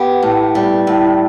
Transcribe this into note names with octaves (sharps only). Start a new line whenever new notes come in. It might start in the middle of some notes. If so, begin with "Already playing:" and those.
Already playing: B3 G4
A2
G3
A2